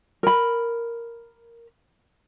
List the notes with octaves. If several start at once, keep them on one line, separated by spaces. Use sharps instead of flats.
A#4 B5